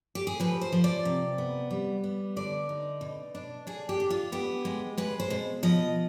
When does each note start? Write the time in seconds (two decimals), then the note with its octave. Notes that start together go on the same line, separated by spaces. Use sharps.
0.15 G4
0.27 G#4
0.40 F3 B4
0.61 C5
0.72 F3
0.84 D5
1.05 C3
1.38 B3
1.71 G3
2.04 B3
2.36 D3 D5
2.69 D#4
3.01 B2
3.35 D4
3.67 D4 G#4
3.89 G4
4.00 D4
4.10 F4
4.32 B3 G4
4.65 G#3
4.98 G#3 B4
5.20 C5
5.30 B2
5.63 F3 D#5